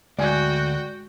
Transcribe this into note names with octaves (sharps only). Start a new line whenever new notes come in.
D2 G#3 F#4 D5 G5 G#5